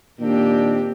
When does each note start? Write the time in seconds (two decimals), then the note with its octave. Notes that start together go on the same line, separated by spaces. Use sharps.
0.20 A#2 D#3 A#3 C4 D4 G4